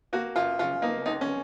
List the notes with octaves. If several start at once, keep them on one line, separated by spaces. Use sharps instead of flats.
A#3 F#4
F#2 F4
C#3 F4
A#3 D#4
C#2 D#4
C#4